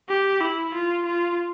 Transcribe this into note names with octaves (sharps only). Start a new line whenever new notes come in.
G4
E4
F4
F4